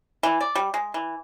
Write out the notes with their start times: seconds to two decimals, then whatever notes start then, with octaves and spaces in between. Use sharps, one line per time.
0.23 E3
0.40 D5
0.55 G3
0.74 G#3
0.94 E3